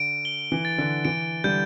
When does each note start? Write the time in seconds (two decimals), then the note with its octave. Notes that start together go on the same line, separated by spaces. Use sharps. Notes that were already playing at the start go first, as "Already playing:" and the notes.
Already playing: D3 D7
0.25 G7
0.52 E3
0.65 A6
0.78 D3
1.05 E3 D7
1.44 D3 G3 G6